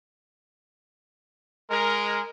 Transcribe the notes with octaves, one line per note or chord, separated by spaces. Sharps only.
G#3 A#4